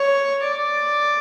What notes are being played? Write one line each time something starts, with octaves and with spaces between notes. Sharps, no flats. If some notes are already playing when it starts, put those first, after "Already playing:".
Already playing: C#5
D5